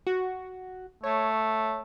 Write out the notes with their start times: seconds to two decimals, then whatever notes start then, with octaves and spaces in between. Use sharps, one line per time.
0.07 F#4
1.03 A3 C#5